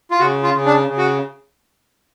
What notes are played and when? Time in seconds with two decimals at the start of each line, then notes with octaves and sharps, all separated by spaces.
0.11 F4
0.20 C#3 F#4
0.43 F4
0.54 C#3
0.66 D4
0.88 C#3
0.98 F#4